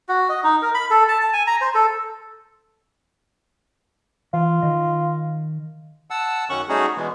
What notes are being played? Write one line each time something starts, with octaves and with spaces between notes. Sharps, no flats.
F#4
D#5
D#4
A#4
B5
A4
A5
A5
G#5
A#5
C5
A4
E3 F4
D#3 D#5
F#5 A5 E6
F#2 D#3 C#4 F#5 C#6 F#6
G3 A3 C#4 D#4 F#4 G#4
B2 E3 G#3 B3